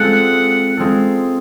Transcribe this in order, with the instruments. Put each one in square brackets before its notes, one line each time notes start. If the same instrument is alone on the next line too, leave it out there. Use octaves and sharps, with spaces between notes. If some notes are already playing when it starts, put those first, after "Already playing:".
Already playing: [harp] G#3 C4 F4 A4 [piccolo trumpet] F#5
[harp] G#3 C4 F4 A4